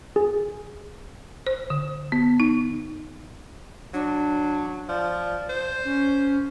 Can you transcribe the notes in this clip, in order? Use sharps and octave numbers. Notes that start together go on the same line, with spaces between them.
G#4
C5
D3
B3
D#4
F#3 D4
F3 D5
C5
C#4